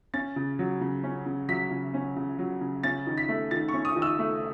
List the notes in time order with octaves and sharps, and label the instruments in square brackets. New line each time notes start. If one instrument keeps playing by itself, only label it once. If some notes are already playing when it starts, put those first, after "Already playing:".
[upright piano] C#4 A6
C#3
F#3
C#3
C#4
C#3
F#3 B6
C#3
C#4
C#3
F#3
C#3
C#4 A6
D#3
B6
A3
D#3 A6
C#6
C#4
D#6
D#3
E6
A3